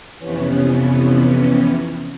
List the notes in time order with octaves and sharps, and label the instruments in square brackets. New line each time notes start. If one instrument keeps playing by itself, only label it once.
[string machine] F2 C3 E3 B3 C#4